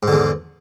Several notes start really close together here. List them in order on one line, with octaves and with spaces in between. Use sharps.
G#2 D3 E2